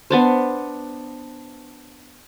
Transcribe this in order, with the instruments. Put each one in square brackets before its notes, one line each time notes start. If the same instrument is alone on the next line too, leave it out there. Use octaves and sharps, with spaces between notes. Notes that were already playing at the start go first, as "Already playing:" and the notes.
[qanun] B3 D4 C5